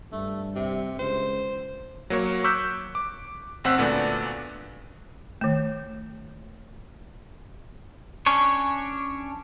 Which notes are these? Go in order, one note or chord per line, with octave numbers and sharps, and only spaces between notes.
G2 A3
C3
C#2 C5
F#3 A#3 C#5
C#6 D6 E6 F#6 G6 B6
D6
A1 C4 F#5 E6 F#6 B6
D2 A#2 A3 B3 D4
D#3 A3
C#4 D4 C#5